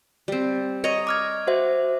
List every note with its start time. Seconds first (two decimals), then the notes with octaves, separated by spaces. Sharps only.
0.28 G3 C4
0.84 C#5 D#5 A#5
1.07 D6 F6 G#6
1.47 F#4 C5 E5